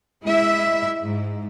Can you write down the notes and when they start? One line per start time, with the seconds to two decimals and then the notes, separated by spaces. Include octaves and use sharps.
0.23 G#3 E4 E5
1.00 G#2